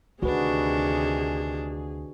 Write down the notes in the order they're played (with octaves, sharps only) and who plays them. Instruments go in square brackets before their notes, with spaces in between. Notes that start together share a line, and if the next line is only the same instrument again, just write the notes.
[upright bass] D2 [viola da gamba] C3 D#3 D4 [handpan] F#4 B4 [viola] G#4